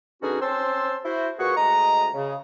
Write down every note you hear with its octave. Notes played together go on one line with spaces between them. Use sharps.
B2 D3 C#4 D#4 F#4 G#4
C4 C#4 C5 A5 C6 E6
E4 F#4 C5
A#2 F#4 G#4 B4 C#6
D2 G#3 D#5 A#5
C#3